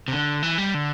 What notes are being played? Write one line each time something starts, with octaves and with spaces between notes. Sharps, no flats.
C3
D3
E3
G3
D3